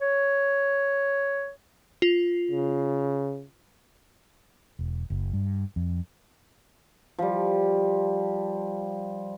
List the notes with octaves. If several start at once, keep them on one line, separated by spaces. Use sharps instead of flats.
C#5
F4
C#3
E1
F#1
G2
F2
F3 G3